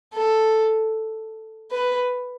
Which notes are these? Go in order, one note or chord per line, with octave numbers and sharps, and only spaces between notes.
A4
B4